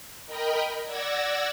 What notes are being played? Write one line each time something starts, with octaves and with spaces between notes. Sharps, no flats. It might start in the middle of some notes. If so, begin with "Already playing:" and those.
A#4 D#5 G5 B5
D5 F#5 E6 G#6 A#6